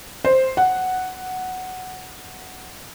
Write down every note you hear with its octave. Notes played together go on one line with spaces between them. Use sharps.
C5
F#5